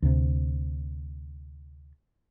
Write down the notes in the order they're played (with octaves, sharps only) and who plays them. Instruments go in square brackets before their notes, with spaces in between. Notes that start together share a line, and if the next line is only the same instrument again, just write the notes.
[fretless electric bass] D2 C3